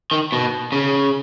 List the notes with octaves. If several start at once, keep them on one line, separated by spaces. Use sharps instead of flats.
D#3
B2
C#3